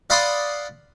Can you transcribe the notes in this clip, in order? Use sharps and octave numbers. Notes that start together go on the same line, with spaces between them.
D5 F5 F#5 B5 C6 D#6